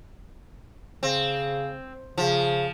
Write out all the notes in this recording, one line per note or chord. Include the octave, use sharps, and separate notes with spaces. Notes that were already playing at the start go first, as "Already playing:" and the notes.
C#3 C4
C#3 F3